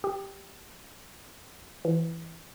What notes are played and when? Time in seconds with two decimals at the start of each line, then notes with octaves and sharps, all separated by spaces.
0.04 G4
1.85 E3